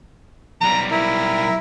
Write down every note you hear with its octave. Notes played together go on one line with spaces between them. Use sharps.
B1 G3 A#5
E4 A#4